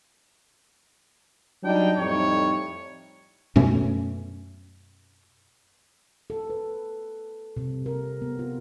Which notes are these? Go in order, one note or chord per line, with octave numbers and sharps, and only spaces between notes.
F#3 G3 D4 D#4 G5
F2 A2 G3 D#4 C#5
F#2 B2 A3 C#4
A4
B4
C3
A#4
B3
F4